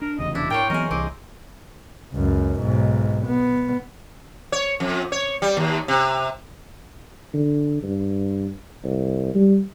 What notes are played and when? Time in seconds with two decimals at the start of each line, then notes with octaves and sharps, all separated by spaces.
0.02 D4 A#4
0.19 F1 E2 C#3 D#5
0.35 D4 E4
0.50 A2 A#4 C5 C#5 G5
0.70 E3 F#3 B3 G#4 A#4 D#5
0.91 C2 E3 C4 D#5 D6
2.13 C#2 F#2
2.60 B1 G#2
3.26 B3
4.52 C#5
4.80 F2
5.12 C#5
5.42 G3
5.57 D#2
5.88 C3
7.34 D3
7.83 G2
8.84 C2
9.35 G3